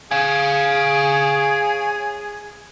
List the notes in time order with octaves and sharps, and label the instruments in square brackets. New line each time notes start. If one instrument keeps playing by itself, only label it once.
[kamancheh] G#4 [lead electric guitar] C#5 F5 [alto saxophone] G#5